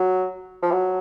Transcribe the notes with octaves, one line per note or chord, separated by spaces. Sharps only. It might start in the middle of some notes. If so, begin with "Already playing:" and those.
Already playing: F#3
F3
F#3